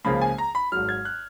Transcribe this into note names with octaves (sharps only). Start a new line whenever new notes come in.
C#2 C#3 F3 A#3 B5
G#5
A#5
B5
G#1 G#2 F#3 F6
G#6
F#6